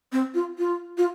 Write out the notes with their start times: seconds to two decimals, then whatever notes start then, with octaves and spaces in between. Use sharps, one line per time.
0.12 C4
0.34 F4
0.58 F4
0.97 F4